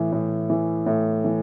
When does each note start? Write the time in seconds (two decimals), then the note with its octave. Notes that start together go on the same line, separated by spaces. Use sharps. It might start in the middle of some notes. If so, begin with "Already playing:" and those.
Already playing: A2 E3
0.12 A2
0.50 E3
0.86 A2
1.24 E3